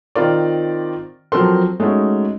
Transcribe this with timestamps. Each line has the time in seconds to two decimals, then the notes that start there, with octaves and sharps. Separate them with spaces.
0.15 D#3 C4 F4 A#4 D5
1.32 F3 F#3 C4 A4 A#4 C6
1.80 G#3 A3 C#4 D#4 F#4